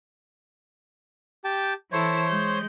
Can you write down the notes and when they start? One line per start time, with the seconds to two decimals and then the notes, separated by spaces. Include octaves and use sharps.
1.45 G4 G5 A5
1.92 E3 E4 A4 C5 C#5
2.28 G#3 G6